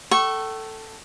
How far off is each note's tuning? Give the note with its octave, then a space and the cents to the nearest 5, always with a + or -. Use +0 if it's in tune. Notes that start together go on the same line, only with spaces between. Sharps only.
A4 +5 G5 -40 C#6 -15